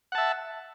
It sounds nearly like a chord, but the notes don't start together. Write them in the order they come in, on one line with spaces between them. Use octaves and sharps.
F#5 A5 E5